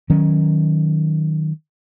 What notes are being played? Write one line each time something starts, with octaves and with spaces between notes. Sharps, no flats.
D#3 F#3 C#4